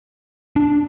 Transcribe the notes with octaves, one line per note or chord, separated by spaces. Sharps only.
D4